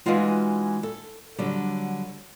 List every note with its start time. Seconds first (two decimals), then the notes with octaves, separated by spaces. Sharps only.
0.06 E3 G#3 C#4 D#4 F4 F#4
0.83 A4
1.38 D3 F#3 G3